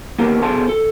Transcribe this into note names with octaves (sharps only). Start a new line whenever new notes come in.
A#3 B3 D#4 G4 A#4 F5
B2 G#4 A4 C5 A5 C6
A4